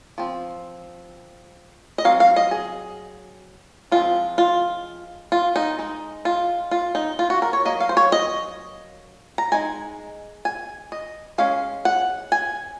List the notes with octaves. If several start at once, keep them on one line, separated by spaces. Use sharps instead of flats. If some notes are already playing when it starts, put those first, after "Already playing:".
F3 C4
D#5
F#3 C4 F5
F5
D#5
G#4
F3 G#3 C4 F4
F4
F4
D#4
G#3 D#4
F4
F4
D#4
F4
F#4
A#4
C#5
F#3 A#3 D#5
F5
C5
C#5
D#5
A#5
G#3 D#4 G#5
G#5
D#5
G#3 C#4 F5
F#5
G#5